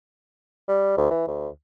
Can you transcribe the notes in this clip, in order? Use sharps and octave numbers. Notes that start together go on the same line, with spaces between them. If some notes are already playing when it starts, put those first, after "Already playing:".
G3
D2
E3
D2